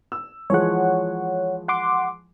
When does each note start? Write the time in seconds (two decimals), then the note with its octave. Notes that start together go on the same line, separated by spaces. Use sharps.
0.12 E6
0.50 E3 F3 G#3 C#5 F#5
1.68 F#5 C6 D6